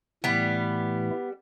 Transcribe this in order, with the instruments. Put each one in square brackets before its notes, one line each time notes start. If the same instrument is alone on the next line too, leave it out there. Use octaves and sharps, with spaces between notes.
[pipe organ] A2 E3 A3 E4 [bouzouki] G3 B3